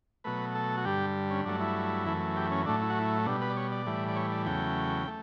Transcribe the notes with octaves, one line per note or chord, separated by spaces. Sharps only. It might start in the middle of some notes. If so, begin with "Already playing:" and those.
B2 F#3 A3 B4
A4
F#4
G2 D3 G3 G4
C#4
G2 F#3 A3 D4
E4
F#2 E3 A3
G4
C#4
A2 F#3 A3 D4
E4
F#4
E4
B2 G3 D4
B4
D5
C#5
D5
A2 E3 G3
D5
C#5
D5
E2 C#3 F#3 A3 G5
A3